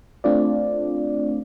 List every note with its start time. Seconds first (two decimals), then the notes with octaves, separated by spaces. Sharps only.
0.24 A3 C4 D4 F4 D5